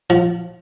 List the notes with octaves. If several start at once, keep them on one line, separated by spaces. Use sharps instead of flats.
F3